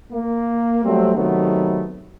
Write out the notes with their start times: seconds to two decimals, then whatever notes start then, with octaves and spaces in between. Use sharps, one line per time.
0.12 A#3
0.85 F#3 G3 A3 C4
1.15 C3 D#3 F#3 A3 B3